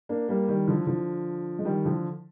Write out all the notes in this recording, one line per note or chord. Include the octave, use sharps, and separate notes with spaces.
A#3 D4
G3 A#3
D#3 G3
D3 F3
D3 F3
G#3
D#3 G3
D3 F3